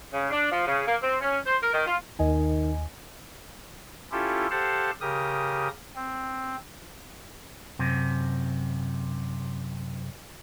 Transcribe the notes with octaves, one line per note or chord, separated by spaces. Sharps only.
C#3
D4
F3
C#3
A#3
C4
C#4
C5
A#4
D#3
F4
D#2 D#3 D#5 G#5
C#4 E4 F4 G4 A4
G4 A4 C5 F5 F#5 A5
C#3 G4 A#4 D#6
C4
F#2 C3